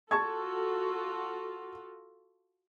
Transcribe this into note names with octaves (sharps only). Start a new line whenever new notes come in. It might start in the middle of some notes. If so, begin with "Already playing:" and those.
F4 F#4 A4 A5 C#6 G#6